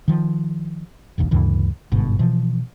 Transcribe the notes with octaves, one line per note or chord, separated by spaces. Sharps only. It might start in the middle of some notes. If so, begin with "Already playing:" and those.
D#3 F3
F1 A#1 D#2
D2 G2 C#3 E3
G1 G#2 B2 D3
B2 E3 F3